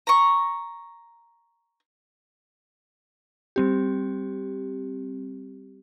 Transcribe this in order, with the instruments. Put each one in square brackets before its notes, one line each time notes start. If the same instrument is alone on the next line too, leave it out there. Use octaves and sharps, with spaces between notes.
[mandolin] A#5 C#6
[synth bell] G3 C4 G4